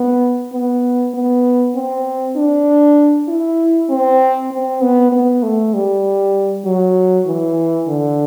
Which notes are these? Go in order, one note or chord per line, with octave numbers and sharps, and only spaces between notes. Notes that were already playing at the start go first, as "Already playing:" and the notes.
Already playing: B3
B3
B3
C4
D4
E4
C4
C4
B3
B3
A3
G3
F#3
E3
D3